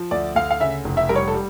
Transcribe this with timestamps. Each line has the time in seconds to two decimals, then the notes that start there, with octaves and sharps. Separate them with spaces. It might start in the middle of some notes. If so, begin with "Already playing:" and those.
Already playing: F3
0.11 D2 D5
0.35 D2 F5
0.51 F5
0.60 C#3 E5
0.84 F1
0.97 E5
1.09 G3 A#4
1.16 C#5
1.28 A4
1.34 G3